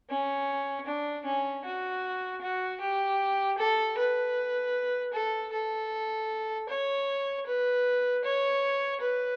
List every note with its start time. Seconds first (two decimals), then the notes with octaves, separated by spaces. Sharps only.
0.10 C#4
0.86 D4
1.25 C#4
1.65 F#4
2.41 F#4
2.81 G4
3.58 A4
3.98 B4
5.14 A4
5.53 A4
6.69 C#5
7.47 B4
8.24 C#5
9.01 B4